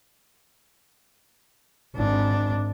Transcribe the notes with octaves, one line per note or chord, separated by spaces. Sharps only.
G#1 D4